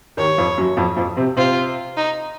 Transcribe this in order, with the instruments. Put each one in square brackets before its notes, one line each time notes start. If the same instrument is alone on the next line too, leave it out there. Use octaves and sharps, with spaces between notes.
[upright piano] D#2 D#3 [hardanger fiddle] C#5
[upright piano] F2 F3
F#2 F#3
F2 F3
F2 F3
C3 C4
[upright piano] C3 C4 [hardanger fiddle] F4
[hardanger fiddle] D#4